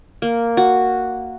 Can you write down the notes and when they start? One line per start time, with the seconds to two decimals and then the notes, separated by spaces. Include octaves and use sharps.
0.22 A#3
0.57 F#4